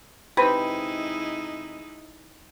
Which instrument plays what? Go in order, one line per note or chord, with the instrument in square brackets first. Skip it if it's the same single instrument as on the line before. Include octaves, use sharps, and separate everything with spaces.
[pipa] C3 B4 C5 [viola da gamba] G#3 D#4 E4